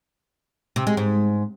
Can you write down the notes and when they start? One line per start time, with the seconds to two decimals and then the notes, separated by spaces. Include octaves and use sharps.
0.76 C3
0.87 G#3
0.97 G#2